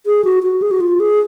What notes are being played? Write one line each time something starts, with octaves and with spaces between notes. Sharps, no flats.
G#4
F#4
F#4
G#4
F#4
F4
G#4